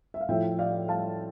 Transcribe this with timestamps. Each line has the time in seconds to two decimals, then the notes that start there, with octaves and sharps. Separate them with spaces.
0.14 E5
0.21 F5
0.29 A2 F3 E5 G5
0.59 D5 F5
0.88 F5 A5